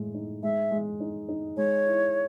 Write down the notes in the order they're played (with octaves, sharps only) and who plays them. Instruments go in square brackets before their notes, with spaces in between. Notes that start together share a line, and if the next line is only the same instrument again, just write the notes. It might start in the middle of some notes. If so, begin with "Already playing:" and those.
Already playing: [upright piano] A2 G#3
D#4
[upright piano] G#3 [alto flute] E5
[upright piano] G#3
D#4
D#4
[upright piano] G#3 [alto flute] C#5
[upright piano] E4